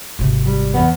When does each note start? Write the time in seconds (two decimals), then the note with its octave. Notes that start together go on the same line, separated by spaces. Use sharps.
0.19 G#1 C3
0.46 G3
0.74 E2 B3